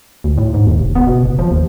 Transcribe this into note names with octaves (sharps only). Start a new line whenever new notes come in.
D2
A2
G#2
D#2
F1
B3
B2
F#1
F3
D#2